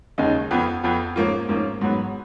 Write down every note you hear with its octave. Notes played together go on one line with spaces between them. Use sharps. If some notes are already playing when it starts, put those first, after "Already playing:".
D#2 C#3 G#3 D#4
F2 F3 B3
F2 F3 B3
G#2 F3 A#3 C#4 F4
G#2 F3 A#3 C#4 F4
G#2 F#3 B3